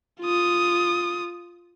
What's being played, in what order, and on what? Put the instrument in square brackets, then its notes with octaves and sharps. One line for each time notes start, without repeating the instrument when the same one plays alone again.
[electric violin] F4 D#6